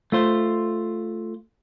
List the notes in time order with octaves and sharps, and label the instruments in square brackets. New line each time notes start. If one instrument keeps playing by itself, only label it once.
[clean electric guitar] A3 F4 C5